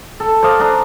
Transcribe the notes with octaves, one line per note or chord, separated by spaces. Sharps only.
A4
C5 D5 D#5 F5
D4 D#5 A#5